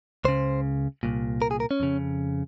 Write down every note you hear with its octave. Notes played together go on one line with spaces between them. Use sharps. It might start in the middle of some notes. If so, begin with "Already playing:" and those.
C#2 C#3 C5
C2 A#2
A#4
G#4
A#4
C#4
F2 C#3